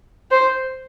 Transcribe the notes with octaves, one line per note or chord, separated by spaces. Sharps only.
C5